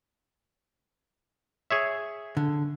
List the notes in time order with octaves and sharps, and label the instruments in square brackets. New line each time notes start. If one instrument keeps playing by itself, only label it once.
[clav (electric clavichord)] G#4 C#5 E5
[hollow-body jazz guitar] D3